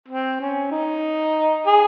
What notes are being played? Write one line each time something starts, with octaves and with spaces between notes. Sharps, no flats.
C4
C#4
D#4
G#4